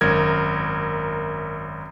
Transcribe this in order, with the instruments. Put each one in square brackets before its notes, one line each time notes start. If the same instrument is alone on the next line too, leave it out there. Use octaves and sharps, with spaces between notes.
[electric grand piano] G#1 F#2 A#4 G#6